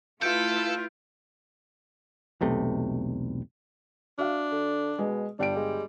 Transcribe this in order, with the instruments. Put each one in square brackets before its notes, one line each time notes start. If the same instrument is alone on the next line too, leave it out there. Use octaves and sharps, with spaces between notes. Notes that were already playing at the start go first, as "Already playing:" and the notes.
[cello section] A3 E4 B4 [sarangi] F4 [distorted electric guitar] A4 [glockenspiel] G6 D7
[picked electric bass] E1 B1 C3 A3
[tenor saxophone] D4 [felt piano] F#4 E5 F5
[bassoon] D3
[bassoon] B2 [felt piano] G#3
[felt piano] G1 G5 D7 [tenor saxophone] G3 [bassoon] D4
[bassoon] G#3